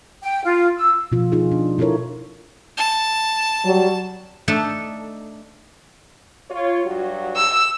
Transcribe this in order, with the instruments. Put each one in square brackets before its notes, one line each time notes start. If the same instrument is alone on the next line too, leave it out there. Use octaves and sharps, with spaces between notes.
[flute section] G5
F4
E6
[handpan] B2 F3 F4
D#4 F4 G#4
D4
D4 E4 F4 A4 A#4 C#5
[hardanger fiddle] A5
[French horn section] F#3 G3
[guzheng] A3 D4 D#4 A4
[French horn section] F4 C#5
G2 F#3 F#4
[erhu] E6